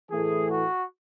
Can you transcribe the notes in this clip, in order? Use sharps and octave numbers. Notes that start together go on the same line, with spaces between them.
A2 E3 A3 G#4
F#4